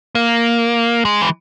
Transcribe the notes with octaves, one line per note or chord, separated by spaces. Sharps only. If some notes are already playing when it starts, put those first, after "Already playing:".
A#3
G#3
E3